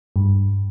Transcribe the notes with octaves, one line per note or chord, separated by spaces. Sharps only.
G2